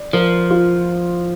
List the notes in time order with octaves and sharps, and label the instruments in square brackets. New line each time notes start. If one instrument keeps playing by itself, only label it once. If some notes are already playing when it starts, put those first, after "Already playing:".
Already playing: [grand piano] D5
[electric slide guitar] F3 [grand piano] A#4
[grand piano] F4